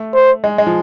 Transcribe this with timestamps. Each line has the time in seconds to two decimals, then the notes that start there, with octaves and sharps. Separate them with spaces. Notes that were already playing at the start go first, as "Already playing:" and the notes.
Already playing: A3
0.14 C5
0.44 G#3
0.58 G#3
0.66 F3